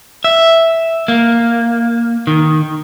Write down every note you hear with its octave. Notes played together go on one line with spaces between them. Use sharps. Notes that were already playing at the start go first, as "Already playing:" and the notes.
E5
A#3
D#3